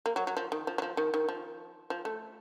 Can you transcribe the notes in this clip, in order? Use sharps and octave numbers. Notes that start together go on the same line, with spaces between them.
A#3
F#3
F#3
F3
D#3
F3
F#3
F3
D#3
D#3
F3
F3
A3